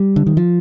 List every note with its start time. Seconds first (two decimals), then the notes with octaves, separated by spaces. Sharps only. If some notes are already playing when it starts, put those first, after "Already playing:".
Already playing: G3
0.16 D3
0.27 D#3
0.37 F3